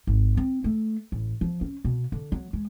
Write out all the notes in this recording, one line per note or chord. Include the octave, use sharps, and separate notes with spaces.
G#1
C4
A3
A1
F3
C#4
B2
D3
F#3
G#3